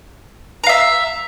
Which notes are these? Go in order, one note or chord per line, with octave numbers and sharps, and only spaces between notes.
E5 F5 A#5